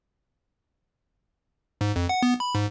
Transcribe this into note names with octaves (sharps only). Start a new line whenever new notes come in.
G#2
F2
F#5
B3
B5
G#2